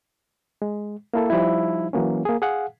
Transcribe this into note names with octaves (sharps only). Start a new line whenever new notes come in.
G#3
A#3 E4 A4
F3 G3 D#4 E4
E3 F#3 A#3 C#4
A#3 G#4
G#4 F5 F#5